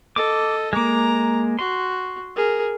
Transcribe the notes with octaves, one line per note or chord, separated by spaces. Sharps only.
A4 D#5 D6
G#3 A#3 A#5 D6
F#4 C6
G#4 A#4